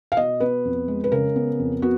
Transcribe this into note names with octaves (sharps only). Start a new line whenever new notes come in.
F5
B2 D#5
B3 B4
F2
G#3
B4
C#3 A#4
B3
F2
B3 F#4